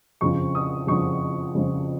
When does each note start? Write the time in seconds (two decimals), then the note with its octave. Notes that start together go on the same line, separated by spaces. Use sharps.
0.21 F2 C#3 F3 C#6
0.55 D#6
0.87 F2 C#3 F3 C#6
1.55 F2 C#3 F3